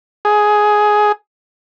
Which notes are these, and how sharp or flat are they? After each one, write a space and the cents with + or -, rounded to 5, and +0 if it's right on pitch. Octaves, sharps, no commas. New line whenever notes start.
G#4 +10